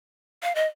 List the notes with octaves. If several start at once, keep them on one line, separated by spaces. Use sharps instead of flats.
F5
D#5